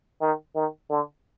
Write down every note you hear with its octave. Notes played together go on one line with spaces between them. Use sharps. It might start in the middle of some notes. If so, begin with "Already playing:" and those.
D#3
D#3
D3